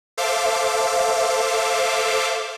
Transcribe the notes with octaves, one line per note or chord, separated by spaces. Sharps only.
A4 C5 E5 F5 D6